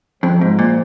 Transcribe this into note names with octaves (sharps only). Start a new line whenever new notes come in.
F2 F3 G#3 C4 F4 C5
G#2
A#2